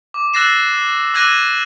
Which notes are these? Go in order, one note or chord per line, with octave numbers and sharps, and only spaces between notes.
D6
E6 F#6 A6 A#6 C7 E7
D6 E6 F#6 G#6 A#6 D#7